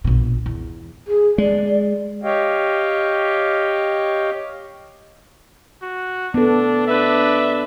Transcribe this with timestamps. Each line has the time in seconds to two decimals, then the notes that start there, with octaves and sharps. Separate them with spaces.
0.04 A#1 B2
0.46 E2
1.07 G#4
1.38 G#3 D5
2.23 G4 C#5 D#5 F5 G5
5.82 F#4
6.34 B3 D4 A4
6.88 D4 B4 E5